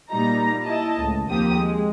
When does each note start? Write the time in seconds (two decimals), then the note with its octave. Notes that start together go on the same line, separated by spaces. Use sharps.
0.10 A#2 G3 D#4 A#5
0.66 E4 D#5 A5
0.97 C#2 A2
1.28 D#2 F3 A#3 C4 G4 D#6
1.59 G#3